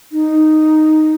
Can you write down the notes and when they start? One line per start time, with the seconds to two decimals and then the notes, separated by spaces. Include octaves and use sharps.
0.12 D#4